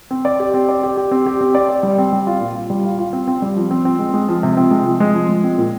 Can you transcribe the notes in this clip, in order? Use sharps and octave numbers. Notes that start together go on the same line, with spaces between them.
C4
D5
G4
C4
D5
G4
G4
C4
G4
C4
D5
D5
G3
C4
G3
F4
A#2
F4
G3
F4
F4
C4
C4
G3
F3
C4
C4
G#3
G#3
F3
C3
C4
G#3
F3
G#3
F3
G#3
C4
A#2